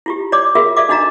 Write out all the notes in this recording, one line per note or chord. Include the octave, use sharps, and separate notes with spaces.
E4 F4 G4
C#5 D5 D6
F4 F#4 G#4 A#4 E5 F5
A4 D5 E5 F5 D6
D4 D#4 F#4 D#5 F5 A#5